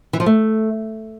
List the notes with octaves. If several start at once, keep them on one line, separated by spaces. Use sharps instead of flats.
E3
F3
A3